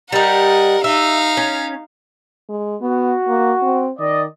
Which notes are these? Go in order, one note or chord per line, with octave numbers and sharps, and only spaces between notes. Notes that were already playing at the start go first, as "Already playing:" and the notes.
G3 D#4 A#4 F#5
D#4 E5 F5
C#4
G#3
B3 F#4
A#3
C4
D#3 D5 D#5